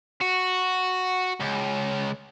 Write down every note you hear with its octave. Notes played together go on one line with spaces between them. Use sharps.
F#4
C#2